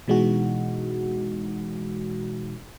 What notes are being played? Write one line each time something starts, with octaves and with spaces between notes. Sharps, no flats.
B2 E3 G#3 D#4 F#4